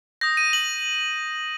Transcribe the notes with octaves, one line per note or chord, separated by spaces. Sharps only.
D#6 G6 A#6
D#7
F#7